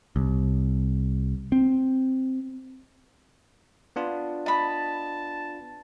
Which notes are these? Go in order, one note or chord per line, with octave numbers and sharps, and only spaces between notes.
C2
C4
B3 D4 F4
D#5 A5 B5